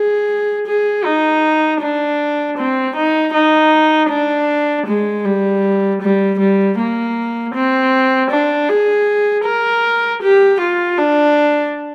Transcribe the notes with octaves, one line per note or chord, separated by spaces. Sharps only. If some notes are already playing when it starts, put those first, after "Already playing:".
Already playing: G#4
G#4
D#4
D4
C4
D#4
D#4
D4
G#3
G3
G3
G3
A#3
C4
D4
G#4
A#4
G4
F4
D4